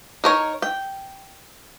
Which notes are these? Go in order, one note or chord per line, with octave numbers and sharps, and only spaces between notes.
D#4 A#4 C#5
G5